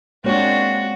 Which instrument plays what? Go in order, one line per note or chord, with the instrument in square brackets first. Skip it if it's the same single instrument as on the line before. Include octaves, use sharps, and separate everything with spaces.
[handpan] G#3 A#3 C#5 [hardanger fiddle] C4 D4 [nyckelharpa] F#4